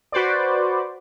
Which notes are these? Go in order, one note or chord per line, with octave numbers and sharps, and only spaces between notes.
F#4 B4 C5 D5